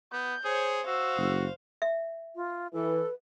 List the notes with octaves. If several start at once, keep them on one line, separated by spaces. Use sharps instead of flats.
B3 G6
G#4 C5 C#5
F#4 C5 F5 E6
F#1
E5
F4
E3 A4 B4